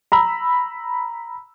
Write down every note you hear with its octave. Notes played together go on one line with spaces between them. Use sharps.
A#5 B5 E6